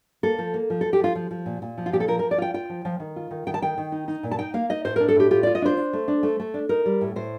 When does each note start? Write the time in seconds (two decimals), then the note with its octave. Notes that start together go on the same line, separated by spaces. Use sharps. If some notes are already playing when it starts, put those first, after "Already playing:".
0.23 A#3 A4
0.38 F3
0.54 A#3
0.70 F3
0.81 A4
0.85 F3
0.93 G4
1.00 F3 F4
1.15 F3
1.31 F3
1.46 A#2
1.62 A#2
1.78 F3
1.86 F4
1.92 A#2 G4
2.00 A4
2.08 F3 A#4
2.19 A#4
2.23 F3
2.31 D5
2.38 F4 G5
2.54 F4 G5
2.69 F3
2.85 F3
3.00 D#3
3.16 F4
3.31 D#3
3.47 D#3 G5
3.54 A5
3.62 D#3 G5
3.78 D#3
3.92 D#4
4.08 D#4
4.23 A#2
4.31 A5
4.39 D#4 G5
4.54 A#3 F5
4.69 D#4 D#5
4.85 A2 C5
4.96 A#4
5.00 D4
5.08 A4
5.15 A2 G4
5.31 F4 G4
5.43 D5
5.47 F4
5.55 D#5
5.62 D4 C5
5.77 D4
5.93 A3
6.08 D4
6.23 A3
6.40 A3
6.54 D4
6.69 D#4 A#4
6.85 G3
7.01 A2
7.16 A2 C5